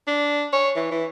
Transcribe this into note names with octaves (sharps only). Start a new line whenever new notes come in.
D4
C#5
E3
E3